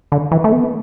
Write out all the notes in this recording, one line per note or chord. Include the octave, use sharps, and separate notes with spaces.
D3
E3
A3
B3